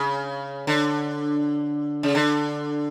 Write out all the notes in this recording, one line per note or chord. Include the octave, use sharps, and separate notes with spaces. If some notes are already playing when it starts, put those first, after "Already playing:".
Already playing: C#3
D3
C#3
D3